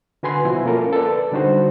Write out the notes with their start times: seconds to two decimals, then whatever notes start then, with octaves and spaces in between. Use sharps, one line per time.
0.23 D3 F#4 B4 G#5 B5 C6
0.45 B2 F3 E4 F#4 G#5
0.65 A#3 C#4 F4 A4 A#4
0.93 A4 B4 D5
1.32 D3 G3 D4 D#4 F#4 C5